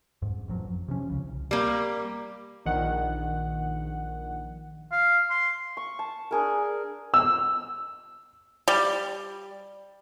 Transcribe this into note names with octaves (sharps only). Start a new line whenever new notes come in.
F2 G#2
A1 F#2 F3 F#3
F2
C3 F3 C#4
C#2 C#3
C2
G3 A#3
A#1 D#3 F#5
F5
C6
C#6
A5
D4 G#4 A#4
E6
G3